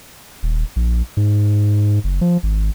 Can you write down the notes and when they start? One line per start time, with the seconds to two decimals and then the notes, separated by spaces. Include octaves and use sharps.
0.43 D#1
0.76 A#1
1.17 G#2
2.04 F#1
2.21 F3
2.43 G#1